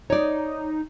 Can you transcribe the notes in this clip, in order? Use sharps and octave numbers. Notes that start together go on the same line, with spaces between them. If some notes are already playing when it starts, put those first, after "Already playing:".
D#4 C#5 D5